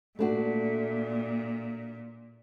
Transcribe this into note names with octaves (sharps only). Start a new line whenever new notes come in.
A#2 A3 D4 F#4